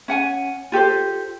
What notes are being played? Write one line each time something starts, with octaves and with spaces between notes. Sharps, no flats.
C#4 F#5 G#5
F4 G4 A4 C5